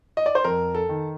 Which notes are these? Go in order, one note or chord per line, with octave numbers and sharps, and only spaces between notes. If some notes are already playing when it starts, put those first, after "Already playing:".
D#5
D5
C5
F2 A#4
A4
D#3